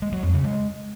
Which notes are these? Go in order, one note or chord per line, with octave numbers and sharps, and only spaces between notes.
G#3
F#3
F2
C#3
G#3